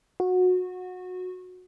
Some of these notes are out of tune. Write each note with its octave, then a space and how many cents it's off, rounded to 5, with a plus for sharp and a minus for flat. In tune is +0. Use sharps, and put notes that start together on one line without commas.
F#4 -20